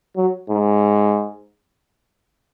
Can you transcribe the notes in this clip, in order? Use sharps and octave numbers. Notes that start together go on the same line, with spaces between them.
F#3
G#2